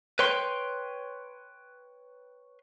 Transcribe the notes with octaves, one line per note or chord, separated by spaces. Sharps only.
B4 C#5 G5 C6